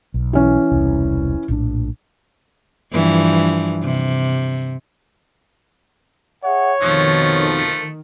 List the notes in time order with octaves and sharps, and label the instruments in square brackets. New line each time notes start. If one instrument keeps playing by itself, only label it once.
[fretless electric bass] B1
[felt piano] E3 C#4
[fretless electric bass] E1 C2
A#1 A2 D4
[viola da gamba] G2 E3 F3
C3
[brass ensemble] G#4 E5 F#5 [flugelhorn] C#5
[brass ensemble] F2 B2 [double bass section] D#3 [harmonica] F3 A3